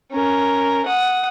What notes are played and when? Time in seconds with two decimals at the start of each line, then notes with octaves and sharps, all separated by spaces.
0.12 C#4 A#4
0.85 F#5 D#6